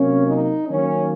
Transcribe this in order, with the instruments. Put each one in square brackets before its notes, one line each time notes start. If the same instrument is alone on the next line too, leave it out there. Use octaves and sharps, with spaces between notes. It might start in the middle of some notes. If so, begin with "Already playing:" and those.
Already playing: [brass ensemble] C3 F#3 A#3 C#4
D#4
D#3 F#3 A#3 C#4